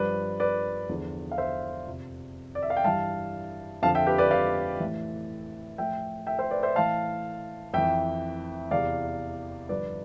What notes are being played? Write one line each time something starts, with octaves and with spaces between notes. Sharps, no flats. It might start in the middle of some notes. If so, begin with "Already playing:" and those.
Already playing: G2 F3 B4 D5
B4 D5
E2 D3 F3
F5
C5 E5
F2 C3 F3
D5
E5
F5
G5
G2 E3 F5 A5
F2 D3 F3 F5 A5
E5 G5
G4 B4
B4 D5
D5 F5
A2 E3
A2 F3 E5 G5
E5 G5
C5 E5
B4 D5
C5 E5
A2 E3 F5 A5
F2 E3 E5 G5
E2 C3 E3 D5 F5
G2 D3 F3 B4 D5